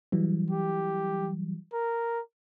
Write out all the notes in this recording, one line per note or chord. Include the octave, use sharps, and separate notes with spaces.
E3 F#3 G3
G4
A#4